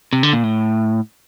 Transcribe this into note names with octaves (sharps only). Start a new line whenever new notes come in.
C3
D3
A#2
A2